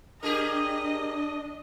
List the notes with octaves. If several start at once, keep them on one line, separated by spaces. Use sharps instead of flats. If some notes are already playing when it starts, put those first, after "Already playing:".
D4 G4 G#4 A#4 D#5